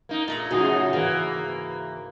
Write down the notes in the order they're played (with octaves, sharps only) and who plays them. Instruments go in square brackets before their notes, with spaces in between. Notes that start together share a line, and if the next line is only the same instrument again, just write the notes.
[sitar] A#3 D#4
[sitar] A#2 [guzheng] A3 A#4 B5
[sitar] F#2 A2 D#4 [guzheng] C#3 [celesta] F#4 G#5 D#6
[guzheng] G#2 [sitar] E3 A#3